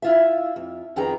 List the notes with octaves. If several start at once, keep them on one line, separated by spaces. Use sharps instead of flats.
E4 F4 E5
F2
F2 D#3 B3 G#4 G5 A#5